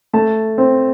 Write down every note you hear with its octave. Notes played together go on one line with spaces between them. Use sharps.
A3 A5
C4